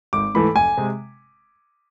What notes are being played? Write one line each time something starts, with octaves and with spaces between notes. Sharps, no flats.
G#1 D6
G#2 E3 A3 B5
F1 G#5
C3 G#3